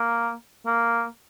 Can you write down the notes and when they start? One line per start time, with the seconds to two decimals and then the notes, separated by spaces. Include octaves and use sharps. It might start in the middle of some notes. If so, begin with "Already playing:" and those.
Already playing: A#3
0.66 A#3